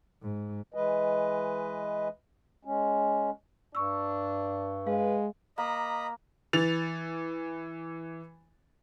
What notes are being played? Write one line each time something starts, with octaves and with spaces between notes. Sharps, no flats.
G#2
E3 G#3 B4 D#5
G#3 C#4
G2 D4 C#6 E6
G#3 B4 F5
A#3 D#5 A#5 B5
E3 A6 F7